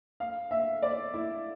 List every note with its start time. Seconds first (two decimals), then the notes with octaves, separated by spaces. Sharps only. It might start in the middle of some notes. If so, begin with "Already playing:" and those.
0.20 F5
0.51 E5
0.82 D5
1.14 E4